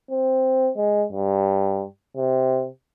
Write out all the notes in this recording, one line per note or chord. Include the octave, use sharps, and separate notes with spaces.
C4
G#3
G2
C3